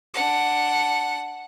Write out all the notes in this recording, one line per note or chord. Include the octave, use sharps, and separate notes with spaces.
D4 F#5